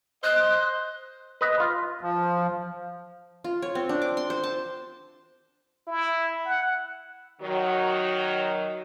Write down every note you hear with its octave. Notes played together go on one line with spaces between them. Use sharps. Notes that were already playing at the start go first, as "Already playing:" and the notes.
C5 D#5 F#6
B4 D#5
F4
F3
F4
C#5
C4
D4
D6
C6
C5
A5
E4
F#5
D#3 F#3